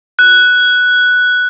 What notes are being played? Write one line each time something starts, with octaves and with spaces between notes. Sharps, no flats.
F#6